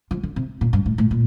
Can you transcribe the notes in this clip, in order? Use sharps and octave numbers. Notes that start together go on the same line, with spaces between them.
F3
D3
C3
A#2
G2
A2
A2
A#2